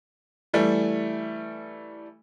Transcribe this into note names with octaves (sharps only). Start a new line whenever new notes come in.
E3 G3 A3